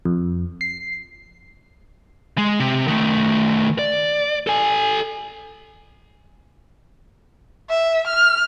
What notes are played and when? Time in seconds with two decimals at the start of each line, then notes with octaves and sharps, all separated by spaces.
0.05 F2
0.61 C7
2.38 G#3
2.60 C3
2.87 D#3 A3
3.79 D5
4.47 A4 G#5
7.69 E5
8.07 F6